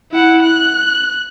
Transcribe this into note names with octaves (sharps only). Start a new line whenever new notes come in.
E4 F#5
F#6